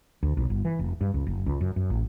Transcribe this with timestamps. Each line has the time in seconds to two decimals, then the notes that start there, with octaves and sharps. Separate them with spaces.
0.23 D2
0.37 B1
0.50 G1
0.65 E3
0.79 F1
1.01 G2
1.14 C#2
1.27 F#1
1.46 C#2
1.61 F#2
1.76 F#2
1.90 A1